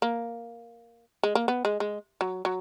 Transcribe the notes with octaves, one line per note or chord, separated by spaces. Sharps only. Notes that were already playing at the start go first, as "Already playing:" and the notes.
A#3
G#3
A#3
B3
G#3
G#3
F#3
F#3